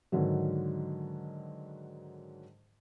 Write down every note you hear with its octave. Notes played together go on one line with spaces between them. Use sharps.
G#2 D3 D#3 F#3